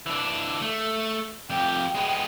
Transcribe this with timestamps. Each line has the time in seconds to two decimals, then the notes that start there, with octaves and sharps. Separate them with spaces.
0.06 E3 D4
0.62 A3
1.50 F2 G4 G5
1.95 G#3 B3